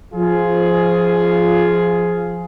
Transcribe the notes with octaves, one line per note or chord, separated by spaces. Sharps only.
F3 F4 G#4